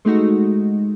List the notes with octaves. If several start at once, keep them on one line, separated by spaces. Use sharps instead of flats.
G#3 A3 D#4 F#4